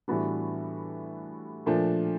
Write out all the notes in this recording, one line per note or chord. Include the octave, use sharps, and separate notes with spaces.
A2 E3 G3 B3 D4 F#4
A#2 F3 A3 D4